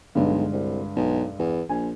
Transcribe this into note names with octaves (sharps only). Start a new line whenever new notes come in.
B1 G2 D3 G#3
C2
B1
E2
A#1 G#5